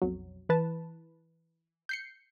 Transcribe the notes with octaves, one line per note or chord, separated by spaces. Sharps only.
B1 F2 F#3
E3 B4 A5
G6 C7 C#7